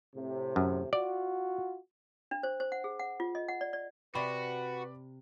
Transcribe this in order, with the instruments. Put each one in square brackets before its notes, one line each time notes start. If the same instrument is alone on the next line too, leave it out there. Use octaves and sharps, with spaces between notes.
[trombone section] A2 C3
[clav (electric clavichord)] F#2
[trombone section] F4 F#4 [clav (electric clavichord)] D5
[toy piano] D4
C5
C5
F#5
G#4
F#5
F4
D#5
F#5
D5
D5
[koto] C3 [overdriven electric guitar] F#4 [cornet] B4 [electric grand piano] D5 B5